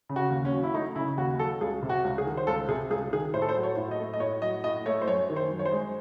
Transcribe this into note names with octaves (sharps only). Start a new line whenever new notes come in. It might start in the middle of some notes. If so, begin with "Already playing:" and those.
C#3
F#4
D#2
C#4
F#3
E4
A3 D#4
C#3 E4
D#2 F#4
F#3 A4
C#2 G#4
C3
F#4
C#2
G#4
D#3
C5
C#2 A4
C3 G#4
C#2 G#4
D#3 G#4
A2 C5
A4
C5
F#3
C#5
A2
D#5
A3
D#5
A2 C#5
F#3 D#5
A2 D#5
A3 C#5
C5
F#2 C#5
D#3
C5
F#2
C#5
C5
G#3